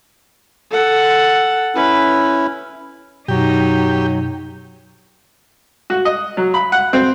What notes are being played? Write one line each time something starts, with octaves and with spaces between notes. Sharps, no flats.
A4 F#5
C#4 E4 B4
F#2 B2 F#3 D#4 G4
F#4
D#5
F#3
B5
F#5
C4